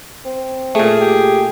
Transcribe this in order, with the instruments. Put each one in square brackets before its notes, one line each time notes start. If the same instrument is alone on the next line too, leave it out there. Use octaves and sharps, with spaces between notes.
[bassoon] C4
[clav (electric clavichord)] A#2 A3 [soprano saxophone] G#4
[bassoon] G4